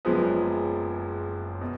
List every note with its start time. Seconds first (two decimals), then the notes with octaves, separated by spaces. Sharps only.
0.05 F#1 F#2 F3 G#3 B3
1.61 B2